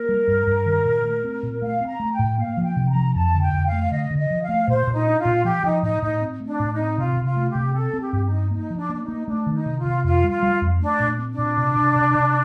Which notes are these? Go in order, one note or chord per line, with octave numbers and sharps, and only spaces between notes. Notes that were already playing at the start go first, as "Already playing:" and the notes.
Already playing: A#3 A#4
G3
G2
G2
D#3
A#2
A3
C4
A#2
A3 F5
C4
A#5
A3
G5
A2
A#3 F5
F3
G5
C3
A#5
F3
F2 A5
D3
G5
F2
F5
A3
D3 D#5
D3
D#5
F3
F5
A3
A#2 C5
A#2
D#4
D4
F4
A#2
F3 G4
F3 D#4
A2 D#4
A2 D#4
C4
A3
D4
A2
D#4
C4
C3 F4
C3
F4
A3
G4
C3
C4 A4
C4
G4
G2
D#4
C4
A#3 D#4
F3
D4
A#3 D4
D#4
A#3
A3 D4
D#3
D#4
C3
F4
C3
F2 F4
G3
F4
G3
F2
A3 D4
A#2
C4
D4
A#2
C3
C3
C3
C3